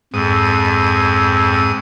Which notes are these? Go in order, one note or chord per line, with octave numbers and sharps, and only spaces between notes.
F2 G#2 D#6